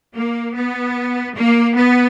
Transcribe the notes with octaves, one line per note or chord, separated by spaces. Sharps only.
A#3
B3
A#3
B3